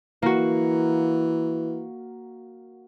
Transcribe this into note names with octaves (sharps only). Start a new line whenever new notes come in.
E3 A#3 F#4